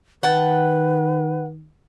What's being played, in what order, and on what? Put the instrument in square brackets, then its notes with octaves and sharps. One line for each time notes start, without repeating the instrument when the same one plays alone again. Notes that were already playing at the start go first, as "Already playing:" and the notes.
[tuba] D#3 [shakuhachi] B4 [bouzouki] F#5 G5 A5